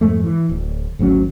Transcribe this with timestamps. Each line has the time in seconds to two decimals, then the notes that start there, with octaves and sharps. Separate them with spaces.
0.01 F2 G#2 G#3 A3
0.24 E3
0.49 D1
0.99 G#1 D2 F#3 C#4